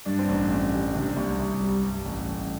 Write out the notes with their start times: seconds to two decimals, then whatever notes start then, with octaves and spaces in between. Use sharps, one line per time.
0.06 G2 D4
0.19 C4
0.28 A1 D4
0.50 A1
0.72 G3
0.94 C3 D4
1.17 C2
1.39 C2
1.61 G3
1.83 G2
2.06 A1
2.28 A1